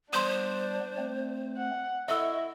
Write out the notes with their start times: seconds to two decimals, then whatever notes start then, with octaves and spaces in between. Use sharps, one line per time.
0.13 G3 B3 D4 C5 C6 D#6
0.98 A3 C4
1.57 F#5
2.08 E4 A4 D#5 E5 C#6 E6